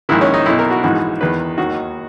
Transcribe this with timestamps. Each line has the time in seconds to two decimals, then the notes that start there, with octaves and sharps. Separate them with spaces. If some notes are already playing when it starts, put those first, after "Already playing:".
0.09 A#1 G#2 D#3 E4
0.21 C#4
0.34 D#4
0.46 B1 B2 E4
0.59 A#4
0.71 F#4
0.83 A#1 G#2 E3 F#4
1.21 E2 D#3 B4
1.58 D#2 D#3 F#4